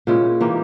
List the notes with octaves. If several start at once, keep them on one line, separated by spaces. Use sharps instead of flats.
A#2 G#3 C#4 E4
E3 A#3 D#4 G4